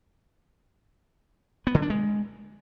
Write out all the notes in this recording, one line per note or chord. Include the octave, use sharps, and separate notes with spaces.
B3
D3
D4
G#3